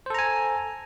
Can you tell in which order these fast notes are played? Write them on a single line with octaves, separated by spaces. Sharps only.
C5 A4 A#5 G#5